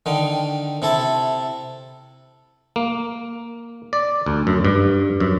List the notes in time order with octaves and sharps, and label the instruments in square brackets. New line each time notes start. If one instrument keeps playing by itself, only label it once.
[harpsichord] D3 D#3 G5
C3 E4 A4 A5
[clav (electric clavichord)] A#3
D5
D2
F#2
G2
F#2